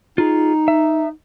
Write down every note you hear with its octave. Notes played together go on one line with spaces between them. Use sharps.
D#4 F4 G#4
E5